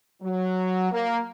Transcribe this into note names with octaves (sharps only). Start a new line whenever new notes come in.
F#3
A#3